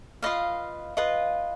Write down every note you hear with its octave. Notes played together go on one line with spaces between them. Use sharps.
F4 B4 D#5 F5
F4 B4 D#5